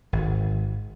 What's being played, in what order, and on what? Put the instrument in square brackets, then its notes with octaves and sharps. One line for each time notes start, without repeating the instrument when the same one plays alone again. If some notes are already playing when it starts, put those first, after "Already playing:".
[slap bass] G#1